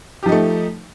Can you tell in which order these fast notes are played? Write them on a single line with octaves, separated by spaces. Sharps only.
G4 F3 D#4 A3